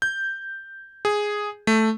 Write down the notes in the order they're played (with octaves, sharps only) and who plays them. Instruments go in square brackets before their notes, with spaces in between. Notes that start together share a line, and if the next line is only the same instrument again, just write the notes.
[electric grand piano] G6
G#4
A3